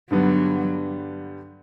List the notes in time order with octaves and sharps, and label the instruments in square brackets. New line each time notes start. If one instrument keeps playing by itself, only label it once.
[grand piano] G2 D3 G3 B3 [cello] F#3